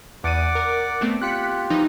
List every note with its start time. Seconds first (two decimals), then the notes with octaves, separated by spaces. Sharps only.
0.24 E2 D5 F#5 D6 D#7
0.55 A#4
1.01 A3 B3 C4
1.22 F4 G4 F#6 B6 C#7
1.70 E3 F3 D#4